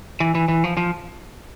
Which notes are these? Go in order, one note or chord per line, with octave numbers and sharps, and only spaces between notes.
E3
E3
E3
F3
F3